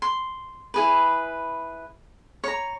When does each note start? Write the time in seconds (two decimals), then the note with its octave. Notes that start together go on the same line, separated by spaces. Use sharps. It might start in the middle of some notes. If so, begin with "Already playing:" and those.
0.02 C6
0.74 E4 G#4 B4
2.44 C#5 A#5